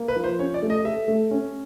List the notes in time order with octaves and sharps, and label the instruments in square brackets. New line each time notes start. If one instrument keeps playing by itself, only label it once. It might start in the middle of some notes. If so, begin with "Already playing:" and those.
Already playing: [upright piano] A#3
[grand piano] B4
[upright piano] F3
[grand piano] C5
[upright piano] C#4 [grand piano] C#5
[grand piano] D5
[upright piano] A3
[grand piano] D#5
[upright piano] A4 [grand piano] E5
[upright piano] A3
C#4